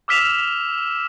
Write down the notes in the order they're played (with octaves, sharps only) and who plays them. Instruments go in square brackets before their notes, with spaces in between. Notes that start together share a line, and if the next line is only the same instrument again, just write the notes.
[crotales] D6 E6 F6 B6 E7 F7